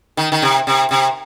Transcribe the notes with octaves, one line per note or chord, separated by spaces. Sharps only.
D#3
D#3
C3
C3
C3